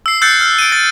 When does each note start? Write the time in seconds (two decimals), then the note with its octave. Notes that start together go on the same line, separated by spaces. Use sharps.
0.06 E6 C7
0.22 E6 F#6 G6 A6 C7 C#7
0.41 F6
0.59 D7 D#7
0.72 A6